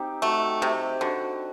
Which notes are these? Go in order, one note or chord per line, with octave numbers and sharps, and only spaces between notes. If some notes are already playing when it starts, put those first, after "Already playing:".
Already playing: C4 D#4 G4
A3 F#4
C3 G4
D3 F#4